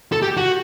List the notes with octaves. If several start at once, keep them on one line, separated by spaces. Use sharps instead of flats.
A4
G4
F#4